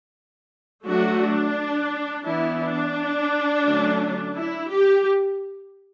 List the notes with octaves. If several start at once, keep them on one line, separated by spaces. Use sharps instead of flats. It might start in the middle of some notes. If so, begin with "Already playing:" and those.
F#3 A3 D4 F#4
D4
E3 B3 D4 E4
D4
D3 F#3 A3 C#4
E4
G4